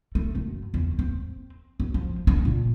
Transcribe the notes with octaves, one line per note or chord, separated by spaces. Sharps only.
A3
F#2
E2
C4
F#2
F3
D4
A#2